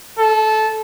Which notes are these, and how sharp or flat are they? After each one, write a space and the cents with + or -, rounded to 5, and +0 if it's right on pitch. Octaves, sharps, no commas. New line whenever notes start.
A4 -20